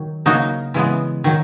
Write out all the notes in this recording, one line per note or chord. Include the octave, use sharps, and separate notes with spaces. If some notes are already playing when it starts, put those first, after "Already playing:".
Already playing: D#3 F#3
C#3 F#3 A#3 D#4 F#4
C#3 E3 G#3 B3
D#3 F#3